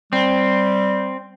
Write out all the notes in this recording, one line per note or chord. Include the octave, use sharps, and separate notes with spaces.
G3 C4